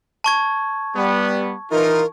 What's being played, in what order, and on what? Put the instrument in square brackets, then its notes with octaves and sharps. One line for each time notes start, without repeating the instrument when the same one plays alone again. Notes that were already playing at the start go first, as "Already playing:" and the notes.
[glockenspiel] A5 C#6 G#6
[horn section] G3 B3
[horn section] E3 D#4 F4 [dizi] A#4